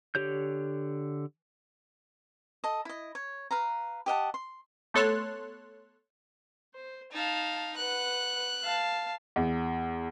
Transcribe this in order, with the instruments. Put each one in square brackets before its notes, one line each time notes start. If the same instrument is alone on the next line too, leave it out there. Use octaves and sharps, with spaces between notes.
[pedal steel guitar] D3 G4 C#5 G6
[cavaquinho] A4 D#5
E4 D#5
C#5
B4 F5 A#5
G4 D#5 F#5 A5
C6
[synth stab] A3 B3 A4 C#5 C6 F#6
[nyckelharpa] C5
[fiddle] D#4 F5 [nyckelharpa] A5
[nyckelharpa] B4 F#5 [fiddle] F#6
[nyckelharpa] F5 A5
[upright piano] E2